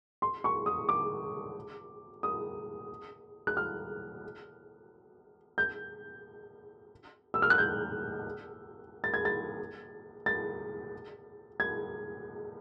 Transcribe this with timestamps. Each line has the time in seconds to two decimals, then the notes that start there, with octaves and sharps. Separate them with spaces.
0.22 C6
0.44 C#6
0.66 D#6
0.89 D6
2.23 D#6
3.47 F#6
3.57 F6
5.58 G6
7.34 E6
7.42 F6
7.50 F#6
7.58 G6
9.04 A6
9.14 G#6
9.25 A6
10.26 A6
11.60 G#6